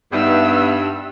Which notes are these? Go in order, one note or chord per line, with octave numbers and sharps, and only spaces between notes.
G2 B3 D#4 G4 E5 E6